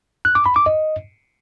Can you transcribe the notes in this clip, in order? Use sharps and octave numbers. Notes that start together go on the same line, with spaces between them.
F#6
D6
B5
D6
D#5